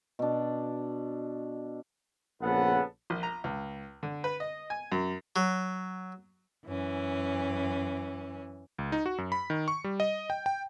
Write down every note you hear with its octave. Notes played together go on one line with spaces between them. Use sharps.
B2 D4
A#1 C#3 B3 A4 F#5
A#1
A#5
C#2
D3
B4
D#5
G#5
F#2
F#3
F#2 E3 C#4
C#2
D#4
F#4
F#2
B5
D#3
C#6
G3
D#5
G5
G5